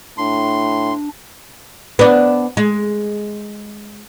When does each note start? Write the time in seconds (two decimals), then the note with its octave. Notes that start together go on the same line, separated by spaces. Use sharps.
0.18 A2 D4 C6
1.99 B3 D4
2.57 G#3